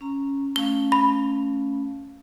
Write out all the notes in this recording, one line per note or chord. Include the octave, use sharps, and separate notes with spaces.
C#4 A#5
A3 C#4 F5 G7
B5